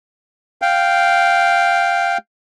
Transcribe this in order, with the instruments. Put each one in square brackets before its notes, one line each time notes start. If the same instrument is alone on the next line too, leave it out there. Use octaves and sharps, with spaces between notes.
[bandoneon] F5 G5